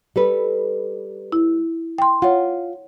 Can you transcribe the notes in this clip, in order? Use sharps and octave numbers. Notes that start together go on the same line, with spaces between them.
G3 A4 B4
E4
G5 C6
F4 C#5 F#5